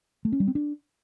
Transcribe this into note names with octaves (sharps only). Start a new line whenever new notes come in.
A3
C#4
G3
C4
D4